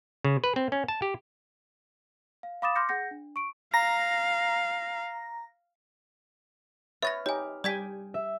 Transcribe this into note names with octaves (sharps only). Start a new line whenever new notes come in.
C#3
B4
C4
C#4
A5
G4
F5
F5 B5 D6 D#6 A6 E7
C6 D6 F6 G6 A#6 C#7
G#4 F#5 G6 A#6 C#7
D4
C#6 D7
F5 A#5 A#6
B4 C#5 E5 F6 A6 A#6
D#4 G4 C#5 G#5
G3 D5 G5 G#5 G#6 B6
E5